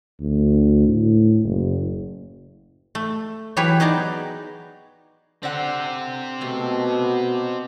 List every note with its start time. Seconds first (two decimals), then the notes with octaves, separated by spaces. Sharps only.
0.21 D2
0.88 A2
1.43 F#1
2.95 A3
3.57 E3 F#3 G4 B4 C#5
3.80 B3 D#4 F#4 G#4 D5
5.43 D3 C4 G4 C5 F#5
6.41 B2 A3 A#3